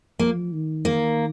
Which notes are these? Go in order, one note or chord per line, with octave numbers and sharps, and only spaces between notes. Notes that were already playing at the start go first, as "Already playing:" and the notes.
F3 A#3
D#3
A#3